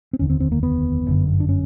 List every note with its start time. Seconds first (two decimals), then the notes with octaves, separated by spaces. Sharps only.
0.13 C4
0.19 F1 D#2 D3 C#4
0.30 C4
0.40 C4
0.52 A#3
0.63 B3
1.06 G1 F#2 D3
1.40 D4
1.49 C#4